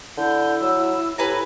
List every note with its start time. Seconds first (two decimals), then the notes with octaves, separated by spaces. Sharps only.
0.17 D3 E4 G6
0.61 F#3 E6
1.18 A2 G4 B4 G#5 A#5